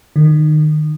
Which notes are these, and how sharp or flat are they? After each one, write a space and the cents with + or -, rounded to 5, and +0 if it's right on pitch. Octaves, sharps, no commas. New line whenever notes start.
D#3 -30